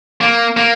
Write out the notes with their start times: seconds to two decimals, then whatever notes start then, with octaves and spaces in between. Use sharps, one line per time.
0.21 A#3
0.57 A#3